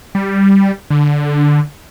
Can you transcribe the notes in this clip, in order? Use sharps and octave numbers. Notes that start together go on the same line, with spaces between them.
G3
D3